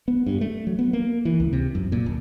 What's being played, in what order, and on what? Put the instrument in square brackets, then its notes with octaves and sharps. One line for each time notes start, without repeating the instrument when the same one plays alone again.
[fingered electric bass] B3
G2
A3
F#3
B3
A#3
E3
C#2
C3
F#2
A#2
D1